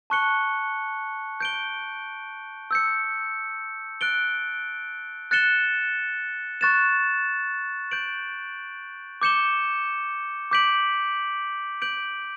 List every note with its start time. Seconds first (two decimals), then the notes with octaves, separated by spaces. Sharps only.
0.10 A5 C#6 F#6 C#7 G7
1.40 G6 D7 G7
2.71 E6 G6 C#7
4.01 F#6 A6 D7 G7
5.31 F#6 A6 C#7 E7 G7
6.61 C#6 F#6 A6 E7
7.91 G6 D7 F#7
9.22 D6 G6 C#7 E7 G7
10.51 D6 G6 B6 D7 F#7
11.82 G6 D7 F#7